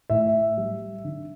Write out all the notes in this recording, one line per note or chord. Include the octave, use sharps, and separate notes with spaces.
A2 E5
G3
D3